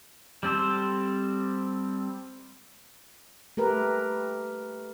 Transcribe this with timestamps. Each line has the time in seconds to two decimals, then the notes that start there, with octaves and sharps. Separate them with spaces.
0.43 G3 C4 A4 C5
3.57 A3 G4 A#4 B4